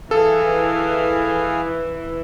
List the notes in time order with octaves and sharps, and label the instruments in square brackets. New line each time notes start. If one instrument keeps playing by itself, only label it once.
[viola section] E3 [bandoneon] G#4 F5 G#5 [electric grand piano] A4